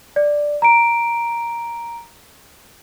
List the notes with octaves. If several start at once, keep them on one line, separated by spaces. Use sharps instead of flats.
D5
A#5 D7